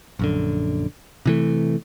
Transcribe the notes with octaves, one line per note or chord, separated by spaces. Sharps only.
A#1 F#2 D3
C3 E3 A3